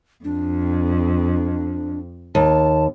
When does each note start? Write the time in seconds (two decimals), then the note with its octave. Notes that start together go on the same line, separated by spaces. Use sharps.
0.24 F2 D4
2.35 D#2 A5